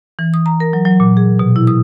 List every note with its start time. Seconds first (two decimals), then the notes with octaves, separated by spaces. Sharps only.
0.19 E3
0.34 D#6
0.46 A#5
0.60 A#4
0.73 F#3
0.85 F#3
1.00 A#2
1.17 G#4
1.39 B2
1.56 E4
1.67 D#6